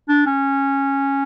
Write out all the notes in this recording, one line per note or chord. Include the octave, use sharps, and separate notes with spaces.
D4
C#4